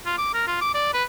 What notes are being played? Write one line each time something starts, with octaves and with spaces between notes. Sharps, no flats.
F4
D6
A#4
F4
D6
D5
B4